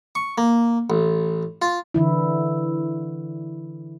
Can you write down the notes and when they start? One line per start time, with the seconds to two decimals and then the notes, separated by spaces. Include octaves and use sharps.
0.15 C#6
0.38 A#3
0.90 A1
1.62 F4
1.94 D3 E3 E4